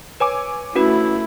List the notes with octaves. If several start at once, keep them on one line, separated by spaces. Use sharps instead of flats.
B4 C#5 G#5 D6
A3 C#4 E4 F#4 B4